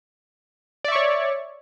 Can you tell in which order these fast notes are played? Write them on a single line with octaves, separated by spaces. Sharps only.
D5 E5 C#6 C#5